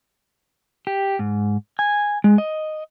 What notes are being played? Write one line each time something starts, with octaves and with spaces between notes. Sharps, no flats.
G4
G#2
G#5
G#3
D#5